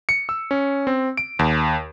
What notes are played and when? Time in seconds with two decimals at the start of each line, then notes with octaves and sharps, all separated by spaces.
0.09 C#7
0.29 E6
0.51 C#4
0.87 C4
1.17 D7
1.39 D#2